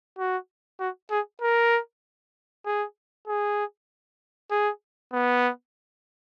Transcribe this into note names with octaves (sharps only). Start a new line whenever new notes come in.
F#4
F#4
G#4
A#4
G#4
G#4
G#4
B3